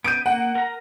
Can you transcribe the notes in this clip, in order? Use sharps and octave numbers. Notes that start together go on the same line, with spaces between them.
B3 D#6 G6 D7 D#7
A#3 F#5
A#4 A#5